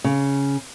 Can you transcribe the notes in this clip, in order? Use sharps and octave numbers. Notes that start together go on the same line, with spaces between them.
C#3